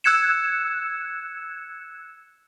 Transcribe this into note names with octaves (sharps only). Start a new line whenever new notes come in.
E6 F#6 G#6 C#7 E7